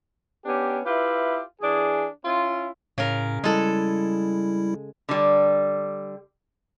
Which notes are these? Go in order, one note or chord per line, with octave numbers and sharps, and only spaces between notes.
B3 C#4 D4 G4
E4 F4 G4 B4 E5
E3 D4 G#4
C#4 E4 F4
A2 C#3 A#4
G3 G#3 E4 A4
D3 G3